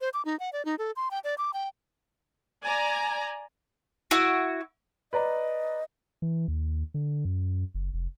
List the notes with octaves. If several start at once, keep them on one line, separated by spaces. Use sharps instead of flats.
C5
D6
D#4
F#5
D5
D#4
A4
C6
G5
D5
D6
G5
D5 G#5 A#5
E4 F#4
B4 D5 D#5 A#5
E3
D#2
D3
F#2
F#1
F1